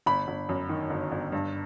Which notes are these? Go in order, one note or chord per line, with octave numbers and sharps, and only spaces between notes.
G1 B5
G1
F#2
D#3
G1
G1
G2